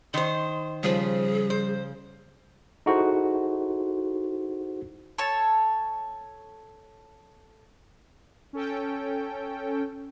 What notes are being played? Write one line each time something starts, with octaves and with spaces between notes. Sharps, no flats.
D#3 C5 C6
C#3 F3 G3 G#4 B5
C5
D#4 E4 F#4 G#4 A4 C5
A4 C#5 A5
C#4 A4 G5